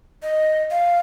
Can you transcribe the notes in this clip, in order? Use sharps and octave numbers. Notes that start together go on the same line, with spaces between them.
D#5
F5